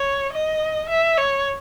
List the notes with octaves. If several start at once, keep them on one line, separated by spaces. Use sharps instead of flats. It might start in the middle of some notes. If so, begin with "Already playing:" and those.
Already playing: C#5
D#5
E5
C#5